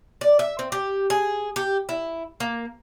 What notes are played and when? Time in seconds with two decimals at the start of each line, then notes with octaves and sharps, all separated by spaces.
0.21 D5
0.39 E5
0.59 C4
0.72 G4
1.10 G#4
1.56 G4
1.89 E4
2.40 A#3